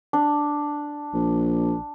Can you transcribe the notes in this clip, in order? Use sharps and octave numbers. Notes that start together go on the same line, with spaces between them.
D4
A#1